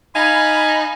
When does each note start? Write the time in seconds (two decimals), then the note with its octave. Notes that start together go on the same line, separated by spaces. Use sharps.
0.16 D#4 F5 G#5 B5